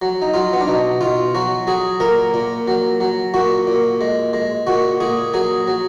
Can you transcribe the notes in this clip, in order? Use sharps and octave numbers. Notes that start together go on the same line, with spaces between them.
F#3
D#4
F#3 F4
B3
D4
B2 D#4
B2 F4
F#3 F#4
F#3 G#4
A#2 A#4
A#2
F#3
F#3
A#2 F#4
A#2
G#3
G#3
A#2 F#4
A#2 G#4
F#3 G#4
F#3